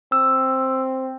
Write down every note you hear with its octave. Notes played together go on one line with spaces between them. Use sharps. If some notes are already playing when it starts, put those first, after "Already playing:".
C4 E6